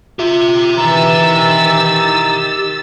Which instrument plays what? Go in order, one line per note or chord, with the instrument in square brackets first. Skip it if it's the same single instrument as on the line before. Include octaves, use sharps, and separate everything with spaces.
[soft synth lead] F4 [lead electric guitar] G4 E5
[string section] D#3 E6 A6 [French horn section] E3 [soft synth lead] A#5